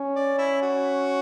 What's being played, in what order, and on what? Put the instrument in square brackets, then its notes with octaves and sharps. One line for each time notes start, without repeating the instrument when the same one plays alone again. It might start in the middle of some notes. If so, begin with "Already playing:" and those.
Already playing: [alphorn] C#4
[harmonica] D5
E4
F#4